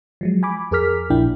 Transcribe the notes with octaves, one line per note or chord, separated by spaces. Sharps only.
F3 F#3 G#3
G#5 B5 D6
F2 G#4 A#4 D6 F6 B6
A#1 A#2 F3 D4 E4 G5